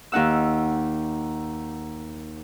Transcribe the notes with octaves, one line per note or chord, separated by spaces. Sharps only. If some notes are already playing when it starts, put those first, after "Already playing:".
D#2 D#4 F#5 E6